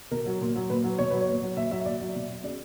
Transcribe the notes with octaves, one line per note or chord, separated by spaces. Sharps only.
B2 A#4
F#3
A#2
F#3
A#2 B4
F#3
B2 C#5
F#3 B4
C#5
A#2
F#3
A#2 E5
F#3 E5
A#2 D5
F#3
B2
F#3
C#3 D5